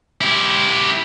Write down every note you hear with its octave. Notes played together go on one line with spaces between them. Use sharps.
E4 G4